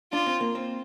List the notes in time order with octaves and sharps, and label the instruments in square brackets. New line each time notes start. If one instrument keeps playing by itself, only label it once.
[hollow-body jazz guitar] D4 [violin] F4
[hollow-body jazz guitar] C4
A#3
C4